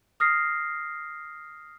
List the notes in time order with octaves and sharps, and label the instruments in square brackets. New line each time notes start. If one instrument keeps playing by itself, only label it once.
[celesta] D#6 F6 A#6 C7